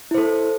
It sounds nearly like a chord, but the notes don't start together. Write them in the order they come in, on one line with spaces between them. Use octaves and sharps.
E4 C5 A4